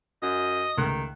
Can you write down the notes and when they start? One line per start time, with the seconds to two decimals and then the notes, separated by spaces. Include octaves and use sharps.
0.23 F#2 D#5
0.77 C#2 D#3 A3 F#6